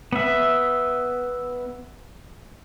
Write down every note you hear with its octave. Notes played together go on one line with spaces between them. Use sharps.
B3 E5